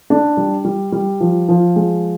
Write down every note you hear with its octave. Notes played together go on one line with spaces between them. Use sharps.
D4
G3
G3
G3
F3
F3
G#3